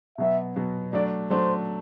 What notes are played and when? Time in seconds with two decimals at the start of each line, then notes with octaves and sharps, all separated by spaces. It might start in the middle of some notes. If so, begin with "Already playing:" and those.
0.18 B2 F#3 B3 E5
0.56 B2 F#3 B3
0.93 F#3 A3 D4 D5
1.30 F#3 A3 D4 C5